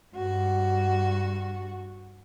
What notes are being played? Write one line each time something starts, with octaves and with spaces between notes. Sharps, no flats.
G2 F#4